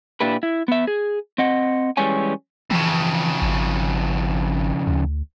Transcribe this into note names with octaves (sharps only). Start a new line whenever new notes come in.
A#2 D4 E4 G4 B4
E4
B3 E5
G#4
C4 D#5 F#5
E3 G3 G#3 C#4 C#5 G#5
F2 C#3 E3
G#1
D2